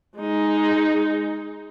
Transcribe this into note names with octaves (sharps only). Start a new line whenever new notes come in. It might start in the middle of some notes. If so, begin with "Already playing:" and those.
G#3 D#4